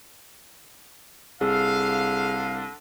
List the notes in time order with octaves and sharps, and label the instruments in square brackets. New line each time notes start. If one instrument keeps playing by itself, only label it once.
[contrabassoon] C2 [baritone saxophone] D3 [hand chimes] G#4 E6 [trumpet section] F5